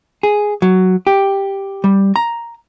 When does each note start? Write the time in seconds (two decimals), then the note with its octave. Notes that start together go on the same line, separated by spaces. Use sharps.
0.23 G#4
0.62 F#3
1.07 G4
1.84 G3
2.16 A#5